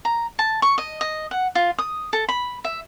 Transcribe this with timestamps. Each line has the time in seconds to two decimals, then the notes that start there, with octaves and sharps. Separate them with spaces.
0.05 A#5
0.39 A5
0.62 C#6
0.78 D#5
1.01 D#5
1.31 F#5
1.55 F4
1.78 D#6
2.13 A4
2.29 B5
2.64 E5